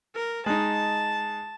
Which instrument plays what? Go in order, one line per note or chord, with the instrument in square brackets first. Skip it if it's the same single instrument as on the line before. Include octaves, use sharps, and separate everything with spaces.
[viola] A#4
[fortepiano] G#3 D#4 [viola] A5